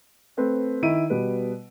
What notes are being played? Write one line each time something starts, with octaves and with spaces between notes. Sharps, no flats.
A3 C4 B4
D#3 E4 D7 D#7
B2 G3 B4